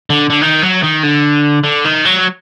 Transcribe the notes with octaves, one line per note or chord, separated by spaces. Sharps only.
D3
D3
D#3
F#3
D#3
D3
D3
D#3
F#3